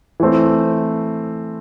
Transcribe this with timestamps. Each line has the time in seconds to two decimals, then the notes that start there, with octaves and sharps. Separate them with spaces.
0.20 E3 A3 C4